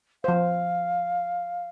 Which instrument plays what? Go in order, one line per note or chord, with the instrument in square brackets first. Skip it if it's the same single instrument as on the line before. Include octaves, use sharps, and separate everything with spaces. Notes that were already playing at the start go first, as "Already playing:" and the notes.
[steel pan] F3 C5 [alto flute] F5